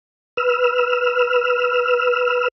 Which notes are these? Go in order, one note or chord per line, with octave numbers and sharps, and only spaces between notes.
B4 E6 F6